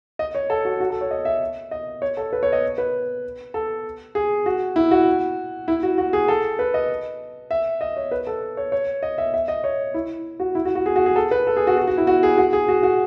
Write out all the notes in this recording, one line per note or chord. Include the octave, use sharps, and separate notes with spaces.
D#5
C#5
A4
F#4
F#4
A4
C#5
D#5
E5
D#5
C#5
A4
B4
C#5
D#5
B4
A4
G#4
F#4
E4
F#4
E4
F#4
F#4
G#4
A4
B4
D#5
E5
D#5
C#5
B4
A4
C#5
C#5
D#5
E5
E5
D#5
C#5
E4
F#4
E4
F#4
F#4
G#4
F#4
G#4
A4
B4
A4
G#4
F#4
F#4
F#4
E4
F#4
G#4
F#4
G#4
F#4
F#4